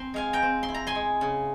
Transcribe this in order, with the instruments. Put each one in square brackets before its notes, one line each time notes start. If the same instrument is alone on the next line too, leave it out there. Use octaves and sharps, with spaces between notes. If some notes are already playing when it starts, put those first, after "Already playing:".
Already playing: [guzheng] C4 A#5 C6
G#3 F5 G#5
G5 A#5
C4
C6
E4
A#5
G#5 C6
G#3
C#3